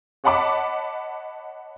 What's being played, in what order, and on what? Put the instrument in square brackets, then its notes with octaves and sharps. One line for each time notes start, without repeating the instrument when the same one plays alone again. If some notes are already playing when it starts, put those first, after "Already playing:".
[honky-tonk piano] C#5 D#5 F#5 A5 B5 D6